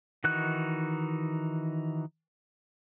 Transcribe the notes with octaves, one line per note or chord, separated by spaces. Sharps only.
D#3 E3 D#4 F#4 F#6